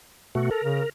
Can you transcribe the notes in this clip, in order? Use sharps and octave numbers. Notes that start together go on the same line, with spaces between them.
B2 A3 F#4
A4 A#4
C#3